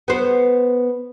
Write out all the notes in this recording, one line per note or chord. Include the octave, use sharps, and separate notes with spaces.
B3 C5